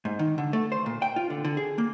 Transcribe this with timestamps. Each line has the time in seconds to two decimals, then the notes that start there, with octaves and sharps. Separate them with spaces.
0.05 G#2
0.19 D#3
0.38 D3
0.53 A3
0.72 C5
0.86 A#2
1.02 G5
1.16 F4
1.30 D3
1.45 D3
1.57 G#4
1.78 A#3